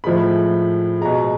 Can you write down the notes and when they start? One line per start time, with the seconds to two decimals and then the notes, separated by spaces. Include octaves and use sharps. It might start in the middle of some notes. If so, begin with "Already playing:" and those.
0.04 A2 F3 G#3 B5
1.01 B2 G#3 A#5